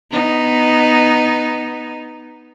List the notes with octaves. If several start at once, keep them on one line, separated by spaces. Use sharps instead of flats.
B3 D#4